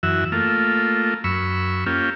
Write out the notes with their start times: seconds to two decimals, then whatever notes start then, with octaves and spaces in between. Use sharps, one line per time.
0.03 F#2 E3 F#4 E5
0.32 A3 A#3 F4
1.24 F#2 B5 C#6 E6
1.86 A#3 C#4 F4 G4